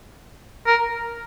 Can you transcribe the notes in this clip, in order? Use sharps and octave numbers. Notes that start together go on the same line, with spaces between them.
A#4